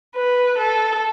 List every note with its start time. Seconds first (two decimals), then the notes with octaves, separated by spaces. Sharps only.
0.16 B4
0.58 A4